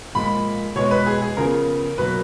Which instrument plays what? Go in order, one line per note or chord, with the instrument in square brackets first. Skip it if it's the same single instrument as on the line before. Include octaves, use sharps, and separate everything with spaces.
[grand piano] A#2 F3 G#3 B5
B2 G#3 B3 C#5
B4
G#4
G#4
C#3 F3 B3 A#4
B2 F#3 A#3 B4